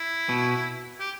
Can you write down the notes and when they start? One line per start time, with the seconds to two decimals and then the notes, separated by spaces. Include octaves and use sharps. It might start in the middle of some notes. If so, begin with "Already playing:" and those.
Already playing: E4
0.29 B2
1.00 G4